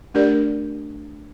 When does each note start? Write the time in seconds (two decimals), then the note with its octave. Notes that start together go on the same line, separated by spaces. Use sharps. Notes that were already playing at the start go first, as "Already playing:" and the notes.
0.14 A3 D4 G4 A#4 D5